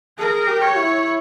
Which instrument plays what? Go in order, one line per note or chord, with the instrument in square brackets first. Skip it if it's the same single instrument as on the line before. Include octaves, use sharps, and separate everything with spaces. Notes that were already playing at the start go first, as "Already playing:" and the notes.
[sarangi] G#4 [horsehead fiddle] A#4
[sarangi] G4
[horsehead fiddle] C#5
[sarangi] E4